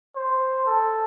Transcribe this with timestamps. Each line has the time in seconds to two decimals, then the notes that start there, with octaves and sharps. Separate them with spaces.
0.16 C5
0.66 A4